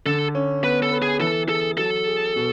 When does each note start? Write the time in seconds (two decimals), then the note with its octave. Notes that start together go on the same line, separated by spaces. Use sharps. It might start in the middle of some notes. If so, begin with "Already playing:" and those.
0.06 D3 A4
0.35 C#4
0.63 B3 B4
0.82 A4
0.92 B4
1.02 G#4
1.21 E3 A4
1.49 G#4 A4
1.77 F#3 A4
2.07 G#4
2.36 B2